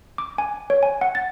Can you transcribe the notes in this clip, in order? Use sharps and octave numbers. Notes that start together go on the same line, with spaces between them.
D6
G#5
C#5
G#5
F#5
A6